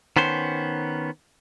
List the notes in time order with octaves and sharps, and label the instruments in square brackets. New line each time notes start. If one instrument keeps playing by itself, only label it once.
[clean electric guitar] D#3 B3 C#4 C5